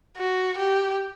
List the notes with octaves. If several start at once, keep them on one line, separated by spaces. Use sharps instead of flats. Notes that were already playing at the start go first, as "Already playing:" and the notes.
F#4
G4